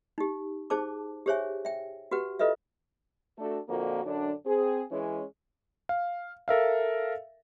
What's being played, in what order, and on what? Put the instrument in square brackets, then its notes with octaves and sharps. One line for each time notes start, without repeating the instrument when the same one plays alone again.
[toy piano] D#4 G4
D#4 G#4 C5 A5 D6
G4 G#4 C5 C#5 E5 G#5
E5 G5
F#4 G4 B4 F#5
F4 A4 B4 D#5 E5
[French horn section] A3 D4 F#4 A4
F2 A#2 D3 A#3 F#4
F#2 D3 D4
C4 G#4
E3 G#3 C#4
[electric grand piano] F5
A4 A#4 E5 F5